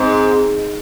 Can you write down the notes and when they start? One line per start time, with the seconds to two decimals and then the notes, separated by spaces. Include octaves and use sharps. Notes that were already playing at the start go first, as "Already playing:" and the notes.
Already playing: G#2 C4